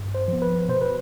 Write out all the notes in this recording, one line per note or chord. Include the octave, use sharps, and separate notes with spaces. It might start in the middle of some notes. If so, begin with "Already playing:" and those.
Already playing: G2
C5
F3
B3
B4
B2 C5
B4